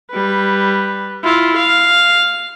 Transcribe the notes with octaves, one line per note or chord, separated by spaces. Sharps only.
G3 B4
E4 F4
F5